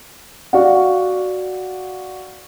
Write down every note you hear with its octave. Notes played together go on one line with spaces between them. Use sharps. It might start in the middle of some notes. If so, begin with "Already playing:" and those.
F#4 D5 F5 F#5